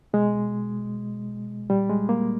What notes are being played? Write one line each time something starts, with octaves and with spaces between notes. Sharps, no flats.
B2 G#3
A#2 G3
G#3
A#3